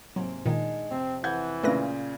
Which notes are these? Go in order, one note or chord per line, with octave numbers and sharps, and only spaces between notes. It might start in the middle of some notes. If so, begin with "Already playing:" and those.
G#2 C3 F#3 A#3
A#2 D#3 G#3 D4 D#4
F2 C3 C4
E3 F#5 G6 G#6
A#2 C#3 A3 B4 A#6